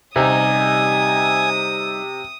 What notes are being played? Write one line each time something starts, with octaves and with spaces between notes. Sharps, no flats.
C3 G3 D#4 G#5 D#6